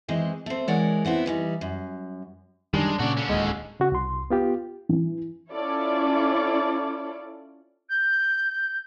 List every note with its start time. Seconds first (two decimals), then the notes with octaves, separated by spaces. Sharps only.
0.08 D#3 E3 G#3 C4 D#5
0.46 A3 C4
0.67 E3 G#3 A#4 C#5 D5 F#5
1.05 E3 B3 C4 E4
1.26 E3 G3 D#4
1.61 F#2
2.74 F#2 D#3 G3 G#3 D4
3.00 A#2 C#3 F#4 D5
3.17 D3 C#4
3.29 D1 D#2 G#3 D#5
3.80 C#3 F#4
3.92 C2 C6
4.30 B3 F4 G4
4.89 E3
5.53 C#4 E4 F4 A4 C#5 D5
7.89 G6